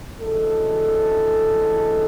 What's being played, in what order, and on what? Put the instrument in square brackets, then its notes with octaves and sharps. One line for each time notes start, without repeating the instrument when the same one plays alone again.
[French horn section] D2 C#3 E3 G#3 A4